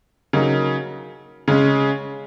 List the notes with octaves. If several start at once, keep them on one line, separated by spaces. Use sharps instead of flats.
C#3 F#3 A#3 D#4
C#3 G#3 C#4